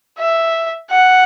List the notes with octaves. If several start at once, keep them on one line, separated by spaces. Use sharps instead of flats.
E5
F#5